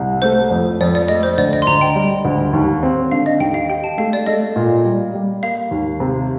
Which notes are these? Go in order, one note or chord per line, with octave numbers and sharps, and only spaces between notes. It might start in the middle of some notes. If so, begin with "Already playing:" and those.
Already playing: C2
A3 C5
F2
F2 D5
D5
A3 D#5
C5
D2 D5
D#5
C6
D2 A#5
G5
G3
D2
D#2
C4
D3 F5
D#5
D#2 G5
F5
G4 G5
A5
A3 F5
D5
A3 D#5
A#2
G3
G3
A#3 F5
D#2
C3